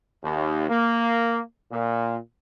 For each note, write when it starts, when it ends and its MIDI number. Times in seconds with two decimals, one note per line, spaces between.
0.23 0.68 39
0.69 1.41 58
1.71 2.16 46